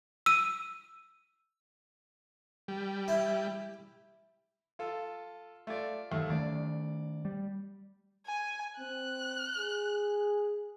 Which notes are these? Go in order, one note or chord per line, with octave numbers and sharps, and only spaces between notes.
E6 D#7
G3
E4
F4 A4
A3 F4 D5
D#2 A3
D#3 A3 D5
G3
G#5
C4 F#6
G#4